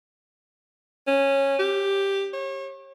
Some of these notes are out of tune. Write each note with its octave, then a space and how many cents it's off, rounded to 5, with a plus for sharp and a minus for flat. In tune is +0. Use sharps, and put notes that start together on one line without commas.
C#4 -10
G4 +5
C#5 -35